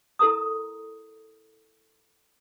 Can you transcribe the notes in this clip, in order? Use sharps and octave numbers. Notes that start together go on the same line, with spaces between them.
E4 A4 A#4 A#5 D#6